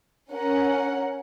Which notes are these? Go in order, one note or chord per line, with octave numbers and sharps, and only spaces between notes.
C#4 A#4 F#5